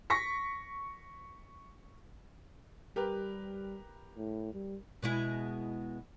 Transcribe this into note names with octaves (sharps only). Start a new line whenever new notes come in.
C#6 A#6 B6
G3 G4 A#4 B4
A2
G3
B2 G#3 E4